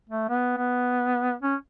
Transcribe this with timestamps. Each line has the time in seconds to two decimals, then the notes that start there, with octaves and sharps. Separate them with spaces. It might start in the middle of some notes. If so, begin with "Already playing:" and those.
0.10 A3
0.29 B3
0.57 B3
1.42 C#4